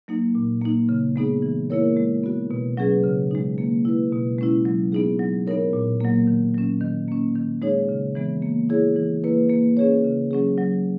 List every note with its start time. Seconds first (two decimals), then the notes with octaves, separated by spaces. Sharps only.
0.08 F#3 A#3 D#4
0.35 A#2
0.62 A#3 D#4
0.89 C#3
1.16 G#3 B3 D#4 G#4
1.42 E3
1.70 A#3 E4 A#4 C#5
1.97 G#3
2.24 B3 F#4
2.51 B2
2.77 F#3 C#4 G#4 B4
3.04 C#3
3.31 G#3 D#4
3.58 A#3
3.85 E4 B4
4.12 B2
4.39 G#3 C#4 E4
4.66 F#3
4.92 B3 D#4 G#4
5.20 F#3
5.47 B3 D#4 A#4 C#5
5.73 A#2
6.01 F#3 A#3
6.27 D#3
6.54 F#3 C#4
6.81 D#3
7.08 A#3 C#4
7.35 D#3
7.62 G#3 D#4 G#4 C#5
7.89 C#3
8.15 E3 G#3 B3
8.42 A#3
8.70 E4 G#4 C#5
8.96 E3
9.24 A#3 E4 B4
9.50 A#3
9.77 C#4 G#4 C#5
10.04 C#3
10.31 F#3 C#4 G#4
10.58 F#3